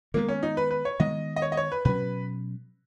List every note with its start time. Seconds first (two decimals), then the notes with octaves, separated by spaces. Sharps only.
0.14 D#3 G#3 A#3 B3
0.28 C#4
0.43 D#4
0.57 B4
0.71 B4
0.85 C#5
1.00 D#3 G#3 B3 D#5
1.36 D#5
1.42 C#5
1.52 D#5
1.57 C#5
1.72 B4
1.85 B2 F#3 C#4 B4